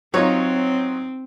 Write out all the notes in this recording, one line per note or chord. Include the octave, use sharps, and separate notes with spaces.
F#3 C4 D#4 F4 C#5